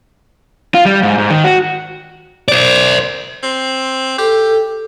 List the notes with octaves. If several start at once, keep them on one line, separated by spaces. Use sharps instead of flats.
F4
G3
G#2
G#2
D#3
F#4
C5 D5
C4
G4 A4